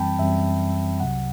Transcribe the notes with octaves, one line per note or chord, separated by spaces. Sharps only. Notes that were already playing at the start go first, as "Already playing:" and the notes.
Already playing: F#2 E3 G3 C4 G5 A5 B5
F#2 E3 G3 C4 E5
C2 C3 F#3 F#5